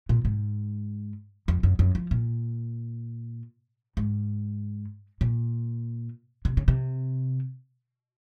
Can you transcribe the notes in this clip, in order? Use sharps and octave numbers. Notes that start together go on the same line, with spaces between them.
A#2
G#2
F2
F#2
F#2
F3
A#2
G#2
A#2
C3
C#3
C3